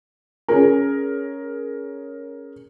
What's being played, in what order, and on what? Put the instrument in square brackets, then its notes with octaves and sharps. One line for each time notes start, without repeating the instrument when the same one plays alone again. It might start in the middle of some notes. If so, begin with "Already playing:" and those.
[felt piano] C#4 G#4 A#4